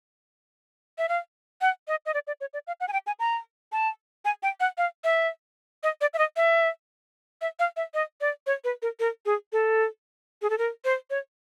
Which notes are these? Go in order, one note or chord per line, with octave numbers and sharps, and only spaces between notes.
E5
F5
F#5
D#5
D#5
D5
D5
C#5
D5
F5
F#5
G#5
G5
G#5
A#5
A5
G#5
G5
F#5
F5
E5
D#5
D5
E5
D#5
E5
E5
F5
E5
D#5
D5
C#5
B4
A#4
A#4
G#4
A4
G#4
A4
A#4
C5
C#5